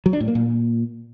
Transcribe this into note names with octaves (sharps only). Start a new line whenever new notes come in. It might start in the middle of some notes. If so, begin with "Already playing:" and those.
F#3
D4
A2
A#3
A#2